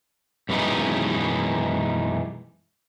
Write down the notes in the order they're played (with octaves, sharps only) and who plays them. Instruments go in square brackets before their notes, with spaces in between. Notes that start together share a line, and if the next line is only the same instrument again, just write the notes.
[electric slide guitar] F#2 B2 E3 G3 G#3 D#4